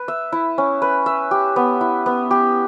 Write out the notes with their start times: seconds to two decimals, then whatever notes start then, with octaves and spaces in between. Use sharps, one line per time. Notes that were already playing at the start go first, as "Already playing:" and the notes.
Already playing: B4
0.08 E5
0.32 E4
0.58 C#4
0.82 B4
1.06 E5
1.31 G4
1.56 B3
1.81 E4
2.06 B3
2.31 G4